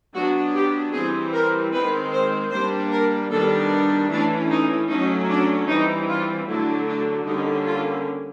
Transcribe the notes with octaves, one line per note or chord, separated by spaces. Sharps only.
F#3 B3 D4 F#4
G4
E3 G3 C4 G#4
A#4
D#3 G#3 C4 B4
C5
G3 A#3 D4 C5
A#4
D#3 G3 B3 D4 A4
E3 A3 C#4 D4
D#4
F#3 A3 C#4 D#4
D4
E3 G3 C4 D#4
F4
D3 F#3 A3 D4 E4
D4
D3 G3 A#3 C#4 D#4
F4